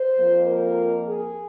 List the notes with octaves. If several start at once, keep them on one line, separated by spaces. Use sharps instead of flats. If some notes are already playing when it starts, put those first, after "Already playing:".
Already playing: C5
F2 F3 A#3
A#4
G#4